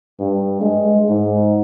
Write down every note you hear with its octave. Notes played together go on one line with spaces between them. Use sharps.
G2
G#3
G#2